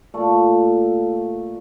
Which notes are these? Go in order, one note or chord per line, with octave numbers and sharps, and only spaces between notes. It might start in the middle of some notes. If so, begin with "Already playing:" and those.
A#2 A3